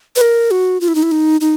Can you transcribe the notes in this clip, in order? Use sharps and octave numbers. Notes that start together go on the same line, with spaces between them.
B4
A#4
F#4
F4
E4
D#4
E4
D#4
D#4